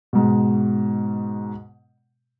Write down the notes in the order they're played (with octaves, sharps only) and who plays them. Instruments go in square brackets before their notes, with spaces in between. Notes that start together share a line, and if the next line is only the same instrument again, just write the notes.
[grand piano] G#2 B2